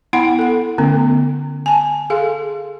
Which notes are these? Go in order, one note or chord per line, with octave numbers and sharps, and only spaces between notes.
B3 E4 F#5 B5
A4 F#5
D3 A3 B3 C#4
G#5 A5
G#4 A4 F5 C6